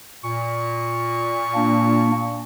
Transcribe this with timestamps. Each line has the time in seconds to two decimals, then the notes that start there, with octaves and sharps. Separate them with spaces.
0.23 A#2 C#6
1.54 A#3 D4